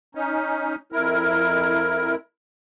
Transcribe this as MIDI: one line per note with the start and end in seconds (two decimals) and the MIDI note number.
0.15 0.75 61
0.15 0.75 63
0.92 2.15 41
0.92 2.15 64
0.92 2.15 70